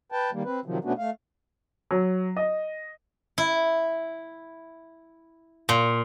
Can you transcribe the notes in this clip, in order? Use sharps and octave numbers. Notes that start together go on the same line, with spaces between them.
B4 G5 A5
D#3 G3 A#3
C4 B4
C3 D#3 F3 F#3
B2 A3 B3 C#4 D4 F#4
A3 F5
F#3
D#5
E4
A#2